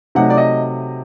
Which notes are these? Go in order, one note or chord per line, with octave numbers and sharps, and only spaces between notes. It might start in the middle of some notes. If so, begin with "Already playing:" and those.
C3 F#3 A3 D#4 F#5
D5
D#5